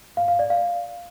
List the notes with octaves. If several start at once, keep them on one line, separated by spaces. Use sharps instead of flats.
F5
F5
D5
F5